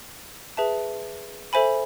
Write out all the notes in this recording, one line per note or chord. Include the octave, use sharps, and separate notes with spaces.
G#4 B4 E5 A5
A4 C5 E5 G#5 B5